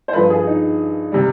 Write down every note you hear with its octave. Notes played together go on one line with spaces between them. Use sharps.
C5
G2 F3 B4
G#4
D#4
C3 G3